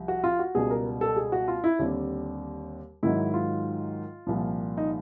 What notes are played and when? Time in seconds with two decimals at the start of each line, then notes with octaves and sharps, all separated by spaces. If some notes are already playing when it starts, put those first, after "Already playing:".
Already playing: C2 F3
0.08 F#4
0.24 F4
0.39 F#4
0.55 C#2 B2 G3 G#4
0.70 A#4
1.01 A4
1.17 G#4
1.32 F#4
1.48 F4
1.64 E4
1.79 D#2 D3 G3 C4
3.03 G#2 D#3 F#3 E4
3.34 F4
4.27 C2 A#2 F3
4.77 D#4